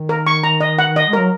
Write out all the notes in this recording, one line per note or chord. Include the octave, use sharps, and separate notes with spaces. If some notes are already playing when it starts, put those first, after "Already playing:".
Already playing: D#3
A#4
C#6
A#5
D#5
F#5
D#5
G#3
A#4
F#3